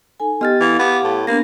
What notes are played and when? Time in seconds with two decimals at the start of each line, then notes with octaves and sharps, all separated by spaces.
0.20 D#4 A4 G#5
0.41 B3 G4 D#5 G5 F6 A6
0.61 E3 F5
0.79 B3 G4 D6
1.04 A2
1.27 A#3 B3 D4 A#6